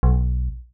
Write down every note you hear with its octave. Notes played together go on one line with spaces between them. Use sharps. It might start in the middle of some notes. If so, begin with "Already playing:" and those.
B1